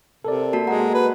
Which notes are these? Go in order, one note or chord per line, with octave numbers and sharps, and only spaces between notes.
C3 A4 A#4 D5
A#3 F#4 A5
G#3 F#5 A#5
B4